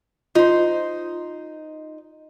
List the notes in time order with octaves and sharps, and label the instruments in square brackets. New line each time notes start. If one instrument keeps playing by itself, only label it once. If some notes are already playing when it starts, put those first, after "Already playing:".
[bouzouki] D#4 C5 [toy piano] F4